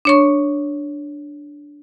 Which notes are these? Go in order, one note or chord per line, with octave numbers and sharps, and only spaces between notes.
D4 C#5 C#6